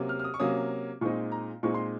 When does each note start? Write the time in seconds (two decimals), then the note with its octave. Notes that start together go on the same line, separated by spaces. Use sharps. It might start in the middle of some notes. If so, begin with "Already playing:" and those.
Already playing: C3 F#3 A#3 C#4
0.09 F6
0.19 F6
0.24 D#6
0.34 C#6
0.39 C3 F#3 A#3 C#4 D#6
1.01 A#2 G#3 C4 D#4 C#6
1.32 A#5
1.63 A#2 G#3 C4 D#4 C#6
1.74 C6